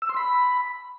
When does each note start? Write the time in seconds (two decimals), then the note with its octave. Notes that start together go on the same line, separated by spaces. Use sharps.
0.02 E6
0.09 C6
0.17 B5